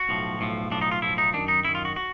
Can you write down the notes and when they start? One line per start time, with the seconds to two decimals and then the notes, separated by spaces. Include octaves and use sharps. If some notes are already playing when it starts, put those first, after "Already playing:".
Already playing: F#4
0.09 B1 A2 F3
0.39 B1 A2 F3
0.71 B1 A2 F3 D4
0.81 D#4
0.91 F4
1.01 B1 A2 F3 E4
1.18 D#4
1.34 F#2 D#3 D4
1.48 D#4
1.64 F#2 E4
1.68 D#3
1.75 F4
1.85 F#4
1.96 F#4